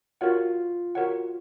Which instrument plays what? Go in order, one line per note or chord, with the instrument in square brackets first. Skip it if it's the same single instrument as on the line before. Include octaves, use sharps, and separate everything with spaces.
[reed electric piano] F4 [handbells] F#4 A#4 C#5 F#5
[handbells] F#4 A#4 C#5 F#5